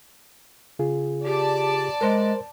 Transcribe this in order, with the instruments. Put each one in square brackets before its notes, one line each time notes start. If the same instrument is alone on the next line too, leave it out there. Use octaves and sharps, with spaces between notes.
[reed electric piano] C#3 F4 G#4
[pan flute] G4 [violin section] D5 A5
[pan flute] G#3 [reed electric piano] A#4 C5